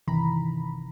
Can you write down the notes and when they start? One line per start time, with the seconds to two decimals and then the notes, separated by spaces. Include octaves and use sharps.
0.07 G1 C3 D#3 E3 A#5 B5